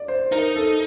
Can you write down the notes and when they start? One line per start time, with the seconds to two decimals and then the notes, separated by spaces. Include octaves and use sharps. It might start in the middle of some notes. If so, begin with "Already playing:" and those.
Already playing: D5
0.08 C5
0.32 D#4 A#4
0.56 A4